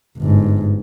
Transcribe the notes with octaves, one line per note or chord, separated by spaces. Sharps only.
G1 G#2